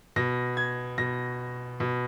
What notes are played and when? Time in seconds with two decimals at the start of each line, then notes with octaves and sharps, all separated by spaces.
0.16 B2 A#6
0.57 G#6
0.98 B2 A#6
1.80 B2